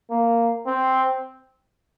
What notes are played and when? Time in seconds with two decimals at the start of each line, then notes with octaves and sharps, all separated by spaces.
0.10 A#3
0.66 C4